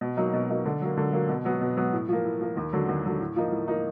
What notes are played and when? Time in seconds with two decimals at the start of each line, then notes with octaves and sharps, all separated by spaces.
0.01 B2
0.17 F#3 A#3 D#4
0.33 B2
0.49 F#3 A#3 D#4
0.65 D3
0.81 F#3 A#3
0.97 D3
1.13 F#3 A#3
1.29 B2
1.45 F#3 B3
1.61 B2
1.76 F#3 B3
1.93 A2
2.09 F3 A#3
2.24 A2
2.41 F3 A#3
2.57 D#2
2.73 D3 F#3
2.88 D#2
3.05 D3 F#3
3.20 A2
3.36 F3 A#3 D#4
3.52 A2
3.68 F3 A#3 D#4